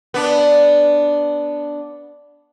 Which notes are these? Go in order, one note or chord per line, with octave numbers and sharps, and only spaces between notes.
B3 D4